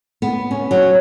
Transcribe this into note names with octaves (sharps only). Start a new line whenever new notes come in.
B3
C#4
F#3